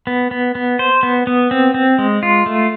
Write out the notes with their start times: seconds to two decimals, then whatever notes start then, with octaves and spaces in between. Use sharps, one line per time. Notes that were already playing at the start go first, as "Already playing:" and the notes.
0.07 B3
0.31 B3
0.55 B3
0.79 C5
1.03 B3
1.27 B3
1.51 C4
1.74 C4
1.99 G#3
2.23 F4
2.46 A3